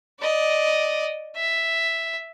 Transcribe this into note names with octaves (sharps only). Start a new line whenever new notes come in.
D5 D#5
E5